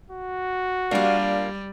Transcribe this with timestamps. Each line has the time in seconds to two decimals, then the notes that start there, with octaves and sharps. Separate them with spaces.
0.10 F#4
0.91 G3 A#3 D4 F4